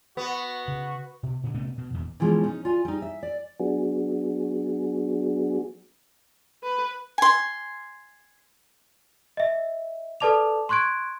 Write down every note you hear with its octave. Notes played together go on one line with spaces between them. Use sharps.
B3 F#4
C#3
B2
A#2 D3 C#4
C3 A3 B3 C#4
B2
D#1 E2
B2 E3 F3 G#3 C#4
C#4 D#4
F4 D5 G#5
G3 D#4
E5
D5
F#3 B3 D4 F#4 G#4
B4
G#5 C6
D#5 E5
A4 B4 D5 A5 D6 F7
C6 C#6 F#6 G#6 D7